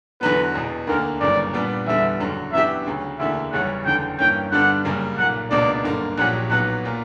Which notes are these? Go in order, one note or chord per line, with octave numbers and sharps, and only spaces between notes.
E2 D3 F#3 B3 B4
E1 E2 B2
D2 D3 A#3 A#4
G1 F#2 C#3 E3 A#3 D5
A#2 G3 B3 D4
E2 D3 G3 B3 E5
F#1 F#2 D3 F#3
F#2 E3 B3 D4 G4 E5
D2 C#3 F#3
E1 D2 D3 A#3 E4 E5
F#1 E2 C#3 G3 C#4 F#5
F#1 E2 D3 G5
G2 E3 A#3 C#4 G5
G2 D3 G3 B3 D4 F#5
F#1 F#2 C#3 G3 A#3
B1 A#2 A#3 F#5
C#2 B2 A#3 D4 D5
G1 F#2 D3 A#3
A#1 A#2 F#3 C#4 G4 F#5
B1 A#2 F#3 B3 F#5
A#2 A#3